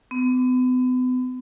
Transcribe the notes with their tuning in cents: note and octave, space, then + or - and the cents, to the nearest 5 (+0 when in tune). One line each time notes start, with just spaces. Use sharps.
B3 +40